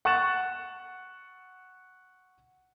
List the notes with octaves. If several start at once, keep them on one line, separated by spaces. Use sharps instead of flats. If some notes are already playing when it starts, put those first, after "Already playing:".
F#5 C#6 F#6 A6 E7